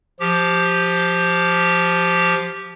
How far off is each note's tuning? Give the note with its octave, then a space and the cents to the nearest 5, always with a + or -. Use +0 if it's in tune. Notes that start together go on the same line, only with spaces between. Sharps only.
F3 +0 G4 +0